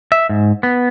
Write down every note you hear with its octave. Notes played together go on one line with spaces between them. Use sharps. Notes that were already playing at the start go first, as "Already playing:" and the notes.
E5
G#2
B3